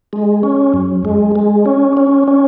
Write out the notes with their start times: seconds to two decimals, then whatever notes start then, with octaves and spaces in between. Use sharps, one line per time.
0.13 G#3
0.43 C#4
0.74 F#2
1.05 G#3
1.36 G#3
1.66 C#4
1.97 C#4
2.28 C#4